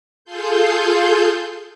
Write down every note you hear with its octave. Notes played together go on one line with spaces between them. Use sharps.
F4 G#4 A4 C6 G6